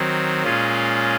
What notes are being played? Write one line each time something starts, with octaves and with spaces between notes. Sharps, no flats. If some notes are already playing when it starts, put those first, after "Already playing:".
Already playing: D#3 F#3 C4
A#2 G#3 C#4 F4